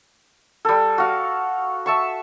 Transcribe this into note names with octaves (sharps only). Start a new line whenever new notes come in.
G3 A4
F#4 F5
E5 A5 C#6